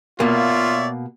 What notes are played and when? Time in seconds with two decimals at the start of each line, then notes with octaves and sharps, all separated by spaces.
0.20 B2 A#3 F4 C#5 D5 E5